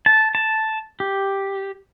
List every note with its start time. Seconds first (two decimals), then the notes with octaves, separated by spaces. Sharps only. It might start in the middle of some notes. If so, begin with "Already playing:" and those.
0.06 A5
0.35 A5
1.00 G4